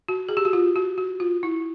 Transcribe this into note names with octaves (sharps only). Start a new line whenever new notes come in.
F#4
G#4
G4
F#4
F4
F#4
F#4
F4
E4